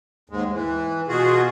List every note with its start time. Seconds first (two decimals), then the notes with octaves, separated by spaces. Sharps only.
0.30 D#2 G#2 G#3
0.51 E3
1.08 B2 F4 F#4 G#4